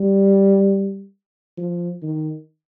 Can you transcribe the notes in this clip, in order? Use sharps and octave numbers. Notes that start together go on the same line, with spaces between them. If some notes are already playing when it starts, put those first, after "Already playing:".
Already playing: G3
F3
D#3